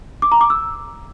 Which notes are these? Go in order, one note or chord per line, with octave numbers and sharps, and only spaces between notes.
D6
A#5
D6
E6